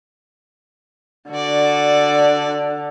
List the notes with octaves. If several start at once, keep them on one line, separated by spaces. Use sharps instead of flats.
D3 F#4 D5